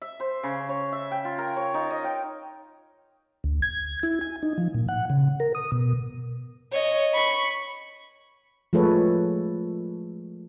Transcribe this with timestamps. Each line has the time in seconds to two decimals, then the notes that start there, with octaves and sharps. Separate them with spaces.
0.02 E5
0.20 C5
0.43 C#3
0.69 C#5
0.92 E5
1.11 G5
1.25 F4
1.38 A#4
1.56 C#5
1.74 D#4
1.90 D#5
2.04 G5
3.44 D2
3.62 G#6
4.03 E4
4.21 G#5
4.43 D#4
4.58 F3
4.74 A#2
4.89 F#5
5.10 C#3
5.40 A#4
5.55 D#6
5.72 B2
6.72 C#5 D#5
7.14 B5 C#6
8.73 F3 G#3 A3 A4 B4 C#5